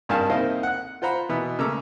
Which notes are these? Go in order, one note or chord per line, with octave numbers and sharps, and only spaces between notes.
G#1 G2 A#4 F5 G#5 A5
A#3 C4 D#4 E4 D#5 F5
F#5 F#6
F4 C5 F#5 A#5 B5
B2 E3 B3 E4
C#3 G#3 A3 A#5 D6 E6